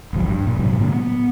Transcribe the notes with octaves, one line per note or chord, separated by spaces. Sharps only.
D1 G#1 F3 F#3
G2
A#2
G#2 C3 F#3 G#3
A2 D3 A#3 D4
B3